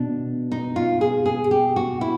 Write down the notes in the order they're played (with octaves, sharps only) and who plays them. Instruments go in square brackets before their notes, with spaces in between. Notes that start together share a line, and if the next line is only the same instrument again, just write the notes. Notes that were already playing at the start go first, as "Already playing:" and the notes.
Already playing: [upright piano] B2 [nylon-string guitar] D4
[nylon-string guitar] D#4
F4
G#4
G#4
G4
F#4
E4